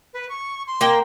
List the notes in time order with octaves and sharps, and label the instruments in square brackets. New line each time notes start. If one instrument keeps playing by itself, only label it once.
[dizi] B4
C#6
C6
[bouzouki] A#3 G5